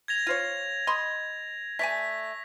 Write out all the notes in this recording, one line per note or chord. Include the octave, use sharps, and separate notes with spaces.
G#6 A#6 F7
F4 C5 C#5
D#5 B5 C6
A3 D5 G#5 B6